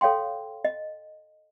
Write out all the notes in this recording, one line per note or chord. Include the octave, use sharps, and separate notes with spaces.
A4 C#5 F5 G5 C6
D#5